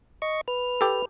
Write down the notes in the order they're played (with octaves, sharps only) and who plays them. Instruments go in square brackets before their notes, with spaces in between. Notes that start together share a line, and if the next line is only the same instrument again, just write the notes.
[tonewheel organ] D#5 C#6
B4 F6
[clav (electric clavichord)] G4 A4